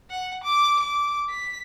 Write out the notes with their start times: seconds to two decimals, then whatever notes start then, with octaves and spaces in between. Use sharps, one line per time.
0.10 F#5
0.44 D6
0.80 D6
1.30 B6